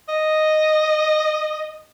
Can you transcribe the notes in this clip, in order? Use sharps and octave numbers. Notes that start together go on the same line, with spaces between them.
D#5